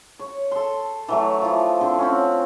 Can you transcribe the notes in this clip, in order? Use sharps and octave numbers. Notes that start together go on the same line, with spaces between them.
C#5
A4 C6
E3 F#3 A3
E3 F3
D3 C4
C4 C#4